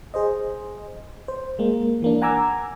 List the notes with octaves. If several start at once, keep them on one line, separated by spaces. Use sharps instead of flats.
G#4 C5 D#5
C5
G#3 A#3
E3 A#3 D4
F#5 G#5 A#5 D6 E6 G#6